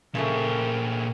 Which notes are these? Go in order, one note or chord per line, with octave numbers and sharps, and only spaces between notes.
A#2 C#3 F3 A3 G#4 A#4 G5